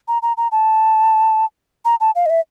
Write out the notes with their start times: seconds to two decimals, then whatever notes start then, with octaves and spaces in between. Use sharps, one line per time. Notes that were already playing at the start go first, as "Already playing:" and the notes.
0.08 A#5
0.22 A#5
0.37 A#5
0.52 A5
1.85 A#5
2.01 A5
2.15 F5
2.26 D#5
2.30 E5